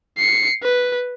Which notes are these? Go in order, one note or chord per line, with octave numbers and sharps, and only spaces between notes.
C7 C#7
B4